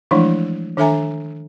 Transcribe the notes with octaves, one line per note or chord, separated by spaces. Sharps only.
E3 F3 G#3 A3 D4 E4
D#3 D4 A4 E5 G#5 A#5